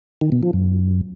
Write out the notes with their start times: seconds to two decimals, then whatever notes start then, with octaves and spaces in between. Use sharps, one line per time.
0.21 D#3
0.32 B2
0.43 F3
0.53 F#2